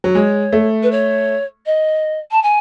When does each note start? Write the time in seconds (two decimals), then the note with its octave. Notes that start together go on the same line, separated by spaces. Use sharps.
0.04 F#3
0.15 G#3 C#5
0.52 A3
0.83 B4
0.91 C#5
1.66 D#5
2.31 A5
2.42 G#5